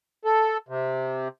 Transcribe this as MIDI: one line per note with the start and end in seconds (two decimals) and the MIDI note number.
0.25 0.57 69
0.69 1.28 48